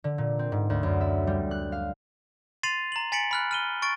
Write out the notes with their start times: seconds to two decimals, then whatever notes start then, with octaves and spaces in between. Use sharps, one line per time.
0.04 D3
0.18 A#2
0.39 C4
0.52 G#2
0.70 D2
0.83 F#2
1.01 E5
1.27 G3
1.51 F#6
1.72 F5
2.63 C6 A6 C7 D#7 F7
2.92 A#5 F#7
3.12 G#5 A6 B6 C#7 D7 F#7
3.31 B5 F6 F#6
3.51 F6 D#7 G7
3.82 C#6 A6 D7